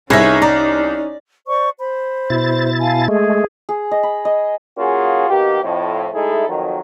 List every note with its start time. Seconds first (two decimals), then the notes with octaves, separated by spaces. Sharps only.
0.10 C2 C#4 D#4 G#4 B4 C#5 E5 A#6
0.42 D5 A#5
1.47 C5 D5 C#6
1.78 C5 B5
2.30 B2 E4 A6
2.80 F5 G#5 A5
3.08 G#3 A3 G#4
3.69 G#4
3.91 D#5
4.03 B5
4.25 D#5
4.78 A#3 C#4 F4 F#4 G#4
5.29 B2 D#3 A#3 G4
5.63 F2 A2
6.13 G#3 A3 D#4 E4 G#4 A4
6.48 F2 D#3 F#3